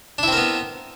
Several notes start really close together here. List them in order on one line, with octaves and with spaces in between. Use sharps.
D4 E4 C4 A#4 B3